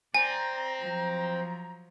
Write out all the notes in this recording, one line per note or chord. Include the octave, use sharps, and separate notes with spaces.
C4 D5 G#5 A#5
F3 F#3